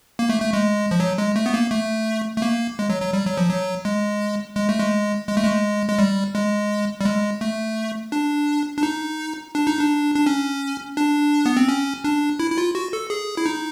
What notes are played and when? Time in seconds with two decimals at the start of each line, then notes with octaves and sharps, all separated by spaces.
0.19 A#3
0.29 A3
0.42 A3
0.53 G#3
0.91 F3
1.00 F#3
1.18 G#3
1.36 A3
1.46 B3
1.54 A#3
1.71 A3
2.37 A3
2.42 A#3
2.79 G#3
2.90 F#3
3.02 F#3
3.13 G3
3.26 F#3
3.37 F3
3.49 F#3
3.85 G#3
4.56 G#3
4.69 A3
4.80 G#3
5.27 G#3
5.37 A3
5.45 G#3
5.89 G#3
5.99 G3
6.35 G#3
7.01 G3
7.05 G#3
7.41 A3
8.12 D4
8.78 D4
8.83 D#4
9.55 D4
9.67 D#4
9.79 D4
10.15 D4
10.26 C#4
10.97 D4
11.46 B3
11.57 C4
11.68 C#4
12.04 D4
12.40 E4
12.51 E4
12.58 F4
12.75 F#4
12.93 A4
13.10 G#4
13.37 E4
13.46 D#4